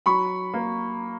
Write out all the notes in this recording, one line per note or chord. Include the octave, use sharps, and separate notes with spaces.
F#3 B5 C#6
A#3